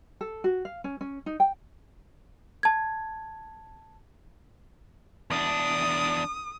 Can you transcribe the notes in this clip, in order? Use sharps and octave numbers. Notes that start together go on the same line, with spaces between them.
A4
F#4
F5
C#4
C#4
D#4
G5
A5 G#6
E2 D4 D#6